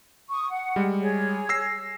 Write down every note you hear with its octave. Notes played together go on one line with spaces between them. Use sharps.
C#6 D#6
F#5
G3 G#3
G#4 C#5
E6 A#6 C7